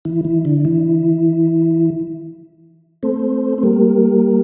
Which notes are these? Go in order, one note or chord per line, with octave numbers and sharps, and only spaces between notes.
E3
E3
D3
E3
A3 C4
C4
G3 A#3